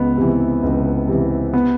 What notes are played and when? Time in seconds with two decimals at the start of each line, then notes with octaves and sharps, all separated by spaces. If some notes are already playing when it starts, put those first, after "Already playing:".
Already playing: C#2 B3
0.17 C3 E3
0.63 C#2
1.08 C3 E3
1.53 B3